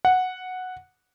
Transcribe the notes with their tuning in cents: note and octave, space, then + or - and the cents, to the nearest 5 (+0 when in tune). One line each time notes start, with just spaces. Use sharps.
F#5 -5